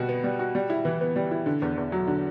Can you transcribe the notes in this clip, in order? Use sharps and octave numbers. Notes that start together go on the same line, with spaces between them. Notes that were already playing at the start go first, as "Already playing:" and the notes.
Already playing: B2 G3 F#4
B3
G3
F#4
G3
E4
E3
B3
G3
E4
D3
E2
E2
F#3
D3